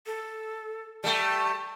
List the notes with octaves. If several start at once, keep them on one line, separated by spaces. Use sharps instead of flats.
A4
G3 A3 A5